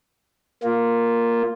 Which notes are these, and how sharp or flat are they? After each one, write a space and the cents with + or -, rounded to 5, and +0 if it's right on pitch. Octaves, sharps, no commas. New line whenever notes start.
A#3 +0 F4 +0